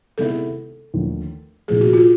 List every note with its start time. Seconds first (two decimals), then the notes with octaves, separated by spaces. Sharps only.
0.18 C3 D#3 G#3 B3 E4 A4
0.94 D#2 D3 F3 A3
1.68 C2 A#2 F3 A3 G#4
1.81 F#4
1.93 F4